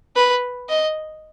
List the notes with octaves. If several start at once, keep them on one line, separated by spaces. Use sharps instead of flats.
B4
D#5